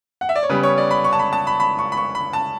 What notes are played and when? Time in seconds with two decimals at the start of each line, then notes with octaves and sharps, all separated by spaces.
0.21 F#5
0.29 E5
0.36 D5
0.43 C#5
0.49 C#3 G3 B3 B4
0.63 C#5
0.78 D5
0.91 B5
1.04 C#6
1.13 A5
1.19 B5
1.33 A5
1.47 B5
1.60 B5
1.79 C#6
1.92 B5
1.97 C#6
2.15 B5
2.33 A5